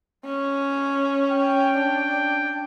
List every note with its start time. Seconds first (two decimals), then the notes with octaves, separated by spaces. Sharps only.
0.25 C#4
1.31 G5
1.77 D4